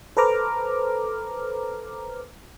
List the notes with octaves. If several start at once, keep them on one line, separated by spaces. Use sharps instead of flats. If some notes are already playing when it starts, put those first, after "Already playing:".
A4 B4 C5 A#5 D6 F6